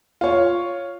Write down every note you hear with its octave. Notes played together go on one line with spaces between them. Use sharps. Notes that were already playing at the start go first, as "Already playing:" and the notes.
F4 C#5